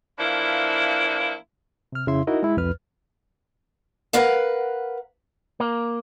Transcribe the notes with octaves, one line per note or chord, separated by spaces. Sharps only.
E3 F3 A#3 D4 E4
C3 F6
F2 C#3 E4 E5 C6
D#4 E4 F#4 A#4 D#5
G#3 E4
C2 F2 B4 F6
A#4 B4 F5 F#5
A#3